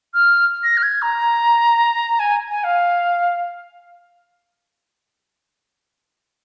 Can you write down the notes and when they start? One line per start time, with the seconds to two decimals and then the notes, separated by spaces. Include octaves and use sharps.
0.14 F6
0.63 A#6
0.77 F6
0.83 G#6
1.02 A#5
2.19 G#5
2.50 G#5
2.64 F5